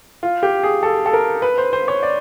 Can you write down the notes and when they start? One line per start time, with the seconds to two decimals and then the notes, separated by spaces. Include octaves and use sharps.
0.23 F4
0.43 G4
0.63 G#4
0.83 A4
1.06 A4
1.13 A#4
1.42 B4
1.58 C5
1.73 C5
1.88 C#5
2.03 D5